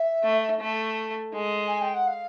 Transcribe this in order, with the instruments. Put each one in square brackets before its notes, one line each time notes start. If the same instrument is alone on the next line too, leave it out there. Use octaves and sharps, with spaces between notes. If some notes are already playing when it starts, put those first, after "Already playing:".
Already playing: [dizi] E5
[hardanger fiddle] A3
A3
G#3
[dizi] G#5
G5
F#5
F5